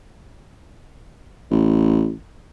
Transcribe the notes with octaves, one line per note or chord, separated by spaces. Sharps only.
A1